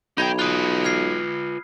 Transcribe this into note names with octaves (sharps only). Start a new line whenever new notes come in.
B1 D#4 G5 B5 G#6
F4 B4 D#6 F#6
F6 G#6 C7